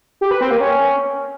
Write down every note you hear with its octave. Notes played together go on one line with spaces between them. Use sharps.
G4
B4
C4
A#3
C#4